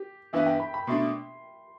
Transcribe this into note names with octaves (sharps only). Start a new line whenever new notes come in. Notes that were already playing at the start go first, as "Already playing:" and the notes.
Already playing: G4
G2 E3 B3 E4 B4 E5
G5
B5
B5
B2 A3 D4 C6